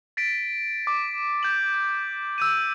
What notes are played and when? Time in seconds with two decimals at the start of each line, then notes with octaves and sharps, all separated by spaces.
0.17 A6 B6 D7
0.87 D6
1.43 G6 F#7
2.38 E6 G6 D#7